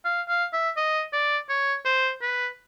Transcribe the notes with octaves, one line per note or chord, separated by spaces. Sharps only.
F5
F5
E5
D#5
D5
C#5
C5
B4